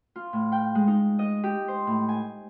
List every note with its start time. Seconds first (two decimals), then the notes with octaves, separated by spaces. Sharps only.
0.16 F4
0.33 A2
0.52 G5
0.75 G#3
0.87 D#4
1.19 D#5
1.44 G4
1.68 C5
1.87 A2
2.09 G#5